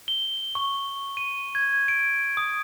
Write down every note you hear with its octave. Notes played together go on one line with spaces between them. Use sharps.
G7
C#6
D#7
G#6
D7
D#6